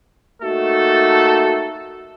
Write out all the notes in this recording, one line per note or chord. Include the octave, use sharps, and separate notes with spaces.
A3 A#3 D#4 F#4 A4